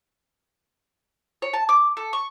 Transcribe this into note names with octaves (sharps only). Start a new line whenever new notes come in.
C#5
A5
D6
A4
C#6